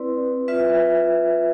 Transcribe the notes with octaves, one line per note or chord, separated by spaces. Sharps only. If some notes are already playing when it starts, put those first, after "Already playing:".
Already playing: C4 E4 B4 D5
F4 B4 E5